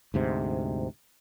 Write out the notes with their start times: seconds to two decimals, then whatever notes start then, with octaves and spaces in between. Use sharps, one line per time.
0.14 D2 G#2 C3